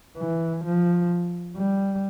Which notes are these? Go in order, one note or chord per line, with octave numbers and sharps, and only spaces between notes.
E3
F3
G3